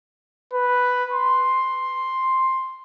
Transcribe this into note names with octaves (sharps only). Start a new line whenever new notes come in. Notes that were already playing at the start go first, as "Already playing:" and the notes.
B4
C6